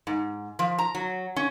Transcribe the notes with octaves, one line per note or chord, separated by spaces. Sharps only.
G#2
F3
A#5
F#3
C#4